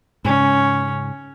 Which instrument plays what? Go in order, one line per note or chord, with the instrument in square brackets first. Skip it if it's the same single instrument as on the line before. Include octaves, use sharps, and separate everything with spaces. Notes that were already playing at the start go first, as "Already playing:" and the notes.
[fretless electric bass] G#2 C#3 [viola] C#4